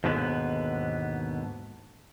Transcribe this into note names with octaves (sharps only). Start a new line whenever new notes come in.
D#2 G#2 B2 D3 B3